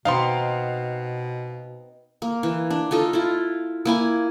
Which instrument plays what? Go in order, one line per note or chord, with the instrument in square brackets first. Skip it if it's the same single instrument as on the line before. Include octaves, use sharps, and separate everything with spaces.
[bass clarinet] B2 [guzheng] B3 C4 D#4 [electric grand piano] F5 C6
[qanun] A#3
E3
D4
D#4 F4 A4 D#5
E4 F4
A#3 E4 G#5